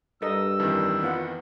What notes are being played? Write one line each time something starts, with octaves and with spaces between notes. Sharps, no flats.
G2 A4 A#4 D#5 E6
F2 D#3 E3
B3 F4 F#5